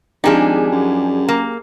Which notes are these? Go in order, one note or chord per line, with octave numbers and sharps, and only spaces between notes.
G#1 F3 D4 D#4 G4 G#4 G#5
F#2
A#3